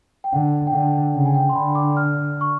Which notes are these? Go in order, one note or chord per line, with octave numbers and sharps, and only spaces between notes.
G5
D3 F#5
G5
D3 F#5
C#3 F#5
G#5
G5
C6
D3 B5
D6
F6
C#6